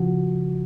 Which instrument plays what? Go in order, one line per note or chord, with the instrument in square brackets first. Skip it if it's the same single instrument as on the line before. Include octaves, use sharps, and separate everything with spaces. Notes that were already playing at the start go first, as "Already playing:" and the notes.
Already playing: [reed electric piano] C#3 F3 F#4